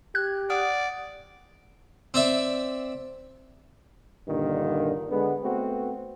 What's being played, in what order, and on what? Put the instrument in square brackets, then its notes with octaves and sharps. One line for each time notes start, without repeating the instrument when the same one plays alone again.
[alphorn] G4 [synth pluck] F#6 G#6
[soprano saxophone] D5 [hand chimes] F#5 D#6 F6
[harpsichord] C4 D5 E5
[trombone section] G2 A#2 D3 D#3
D3 G#3 B3
A3 B3 C4 F#4